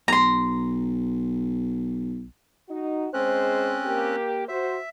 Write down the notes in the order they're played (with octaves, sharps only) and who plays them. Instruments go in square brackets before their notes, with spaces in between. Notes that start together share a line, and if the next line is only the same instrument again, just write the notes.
[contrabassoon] B1 [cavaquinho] A#5 C6
[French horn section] D#4 F#4
[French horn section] G#3 C5 [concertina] C4 C#4 F#6
[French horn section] A#3 G4
[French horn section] F#4 C5 [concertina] E5